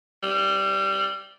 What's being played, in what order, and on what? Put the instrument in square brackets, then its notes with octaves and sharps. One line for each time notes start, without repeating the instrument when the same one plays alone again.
[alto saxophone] G3